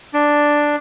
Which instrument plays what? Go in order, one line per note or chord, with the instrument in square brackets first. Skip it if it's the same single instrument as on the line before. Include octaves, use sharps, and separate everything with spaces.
[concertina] D4